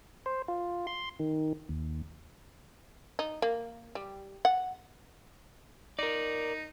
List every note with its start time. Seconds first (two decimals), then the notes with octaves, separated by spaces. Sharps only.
0.26 C5
0.48 F4
0.87 C6
1.19 D#3
1.69 D#2
3.19 D#4
3.42 A#3
3.95 G3
4.45 F#5
5.99 D#4 A#4 D5